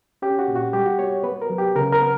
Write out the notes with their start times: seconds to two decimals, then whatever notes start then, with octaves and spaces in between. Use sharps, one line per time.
0.22 C#4 G4
0.39 F#4
0.48 A#2
0.55 F#4
0.73 G3 G4
0.86 F#4
0.99 B3 C#5
1.24 B3 B4
1.42 A#4
1.50 F#3
1.58 G4
1.76 C#3 A#4
1.93 A#4
2.01 B3